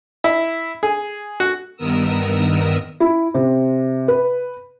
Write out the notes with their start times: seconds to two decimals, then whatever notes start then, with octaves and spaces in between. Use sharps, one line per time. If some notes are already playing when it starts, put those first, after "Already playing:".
0.24 E4
0.83 G#4
1.40 F#4
1.76 G2 D#3 B3 A#4 D#6 E6
3.00 E4
3.34 C3
4.08 B4